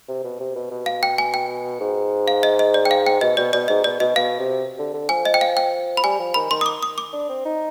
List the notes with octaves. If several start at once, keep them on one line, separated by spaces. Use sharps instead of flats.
C3
B2
C3
B2
B2
F5
G5
G#5
G5
G#2
F5
D#5
D#5
D5
G5
F5
G5
B2 D#5
B2 D5
B2 D5
G#2 D#5
B2 D5
B2 D#5
B2 F5
C3
D3
D3
F3 G#5
D#5
G5
F5
G5
B5
G3 G#5
F3
D#3 B5
D#3 C6
D#6
D6
D#6
D6
D4
C4
D#4